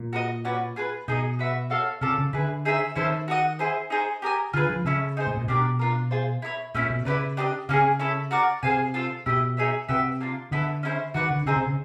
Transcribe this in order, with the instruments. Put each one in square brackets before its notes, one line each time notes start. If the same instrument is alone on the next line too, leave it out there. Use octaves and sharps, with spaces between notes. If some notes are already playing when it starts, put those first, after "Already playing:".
Already playing: [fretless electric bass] A#2
[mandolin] F#4 B4 D#5
C#4 F#4 B4 D5
F4 G#4 B4
[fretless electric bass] B2 [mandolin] D#4 G#4 C5 D#5
[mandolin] F#4 B4 E5
F#4 A4 C#5 F5
[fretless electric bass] C3 [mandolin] C#4 F4 A4 D5
[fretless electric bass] C#3
[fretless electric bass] D3 [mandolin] E4 G#4 B4
[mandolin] D#4 G#4 C5 E5
[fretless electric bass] D#3 [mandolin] C#4 E4 A4 C5
[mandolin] F#4 A#4 D#5 F#5
E4 G#4 C5
D#4 G#4 C5
G4 A#4 D#5 G#5
[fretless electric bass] D3 [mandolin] F4 G#4 B4
[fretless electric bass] F3
[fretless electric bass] C#3 [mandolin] C#4 E4 A4
[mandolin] D#4 G#4 C5
[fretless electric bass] A2
A#2
[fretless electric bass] B2 [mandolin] D4 G4 A#4 D5
[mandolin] D4 F4 A#4
F4 G#4 C5
E4 A4 C#5
[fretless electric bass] A#2 [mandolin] A3 C#4 E4
[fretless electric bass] B2
[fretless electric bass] C#3 [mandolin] E4 G4 B4 D5
[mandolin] D4 G4 B4 D#5
[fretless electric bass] C#3 [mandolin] A#3 C#4 F4 G#4
[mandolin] C#4 E4 A4
F#4 A#4 D5 F#5
[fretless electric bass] C3 [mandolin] G#4 C5 F5 G#5
[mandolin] F4 A4 C5 F5
[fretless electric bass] B2 [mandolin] E4 G4 C5 D#5
[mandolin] D#4 G#4 C#5 E5
[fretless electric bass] C3 [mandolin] F#4 B4 E5 G5
[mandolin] A#3 D4 F4
[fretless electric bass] D3 [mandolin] B3 E4 A4
[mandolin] C#4 E4 A4 C5
[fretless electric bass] D#3 [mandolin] F#4 B4 D5 F#5
[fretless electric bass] D3
[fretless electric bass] C#3 [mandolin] C4 D#4 G#4 C5
[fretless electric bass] C3
C#3